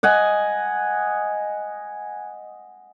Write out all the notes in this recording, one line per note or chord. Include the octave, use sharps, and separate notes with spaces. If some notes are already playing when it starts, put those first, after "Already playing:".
D#5 F#5 G#5